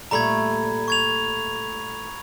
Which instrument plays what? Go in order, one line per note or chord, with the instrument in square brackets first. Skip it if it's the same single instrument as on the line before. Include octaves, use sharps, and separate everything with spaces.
[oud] A#2 G3 A3 [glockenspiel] A#5 B5 G#6
[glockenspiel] C#6 G#6 F7